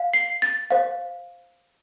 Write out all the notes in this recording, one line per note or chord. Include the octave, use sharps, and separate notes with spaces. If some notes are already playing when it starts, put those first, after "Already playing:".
Already playing: F5
C7
A6
C5 F5